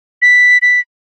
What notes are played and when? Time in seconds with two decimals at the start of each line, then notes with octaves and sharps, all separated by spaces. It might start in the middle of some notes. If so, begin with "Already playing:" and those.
0.22 B6
0.62 B6